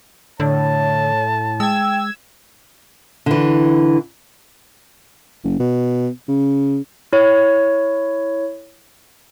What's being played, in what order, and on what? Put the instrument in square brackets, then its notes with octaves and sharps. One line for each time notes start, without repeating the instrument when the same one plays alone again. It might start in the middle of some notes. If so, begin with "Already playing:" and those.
[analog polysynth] A2 [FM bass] D3 [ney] C#5 [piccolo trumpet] A5
[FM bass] G#3 [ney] G5 [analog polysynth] E6 G#6
[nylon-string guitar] D3 E3
[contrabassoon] F#1
B2
C#3
[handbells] E4 C#5